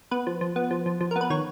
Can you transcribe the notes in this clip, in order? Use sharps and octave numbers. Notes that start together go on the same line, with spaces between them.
B3 B4
F3
F3
B3
F3
F3
F3
A#4
B3
B4
D#3 C#5